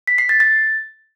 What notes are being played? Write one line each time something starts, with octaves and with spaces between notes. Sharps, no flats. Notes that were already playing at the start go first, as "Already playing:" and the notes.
B6
C7
A6
A6